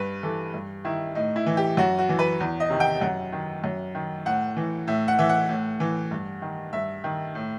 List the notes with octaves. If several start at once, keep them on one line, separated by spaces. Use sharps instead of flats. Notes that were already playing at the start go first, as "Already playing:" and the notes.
Already playing: G2 B4
E3 A4
G2
D#3 E4
A2 D#4
E4
E3
G4
F#2 F#4
F#4
E3
B4
E2
D#5
C3 D#3
G5
F#2 F#5
D#3
F#2
D#3
A2 F#5
E3
A2 E5
F#5
E3 E5
F#5
A2
E3
G2
D#3
G2 E5
D#3
A2